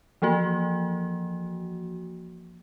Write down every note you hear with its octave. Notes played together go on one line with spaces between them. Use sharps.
E3 F3 A#3 F#4